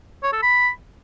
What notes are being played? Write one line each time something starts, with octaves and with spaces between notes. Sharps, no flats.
C#5
A4
B5